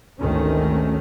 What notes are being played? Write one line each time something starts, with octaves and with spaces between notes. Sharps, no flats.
G#1 D2 D#3 A3 C#4